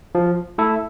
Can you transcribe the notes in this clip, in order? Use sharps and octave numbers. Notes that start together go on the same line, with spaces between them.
F3
A3 E4 A4